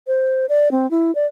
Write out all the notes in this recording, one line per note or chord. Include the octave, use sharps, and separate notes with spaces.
C5
D5
C4
E4
D5